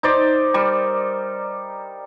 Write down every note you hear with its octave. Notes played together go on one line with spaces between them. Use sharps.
D#4 C5 D5
G3 A#4